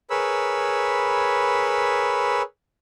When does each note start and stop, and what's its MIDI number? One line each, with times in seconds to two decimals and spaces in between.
0.10 2.42 68
0.10 2.42 70
0.10 2.42 71
0.10 2.42 73
0.10 2.42 83
0.10 2.42 88